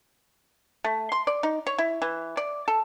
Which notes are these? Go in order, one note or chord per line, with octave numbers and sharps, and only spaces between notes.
A3
C6
D5
D#4
C#5
E4
E3
D5
A4